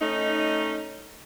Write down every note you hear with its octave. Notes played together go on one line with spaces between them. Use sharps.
A3 C#4 D#4